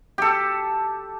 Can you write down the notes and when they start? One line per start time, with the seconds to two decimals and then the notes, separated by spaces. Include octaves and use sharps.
0.18 G4 A4